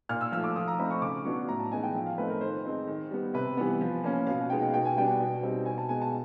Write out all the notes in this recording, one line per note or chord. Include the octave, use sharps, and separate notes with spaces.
A#2 F6
E6
F3 A3 E6
D6
F3 D#6
A#5
A3 C4 D#4 B5
C#6
C#3 D6
F#3 B3 D4 C#6
A2 A#5
A5
E3 G#3 B3 D#4 G#5
G5
F3
F5
A3 C4 D#4 B4
A#4
D#3 C5
G#3 C4 D#4
D#3
G3 B3
C3 B4
E3 G3 B3
F3
A#3 C#4
B2 F5
G#3 B3 D#4 G5
B2 G5
G#5
G3 B3 D4 G5
B2
G3 C4 D#4
B2 G#5
A5
G#3 B3 G#5
A5